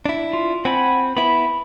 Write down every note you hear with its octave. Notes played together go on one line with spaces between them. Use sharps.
D4 E4
F4
C4 F#5 G#5 B5
B3 E4 B5